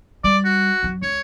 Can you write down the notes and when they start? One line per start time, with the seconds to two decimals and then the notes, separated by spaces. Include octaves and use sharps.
0.24 G3 D5
0.45 F#4
0.83 F#2 F#3
1.02 C#2 C#5